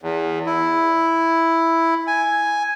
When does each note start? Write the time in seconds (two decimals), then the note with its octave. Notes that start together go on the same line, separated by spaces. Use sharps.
0.02 E2
0.46 E4
2.07 G#5